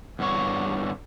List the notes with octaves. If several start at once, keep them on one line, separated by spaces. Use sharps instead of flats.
E2 G2 D3 C#5